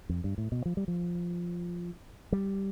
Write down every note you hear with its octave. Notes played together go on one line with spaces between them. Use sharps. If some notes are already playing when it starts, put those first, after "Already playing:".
F2
G2
A2
B2
F3
G3
F3
G3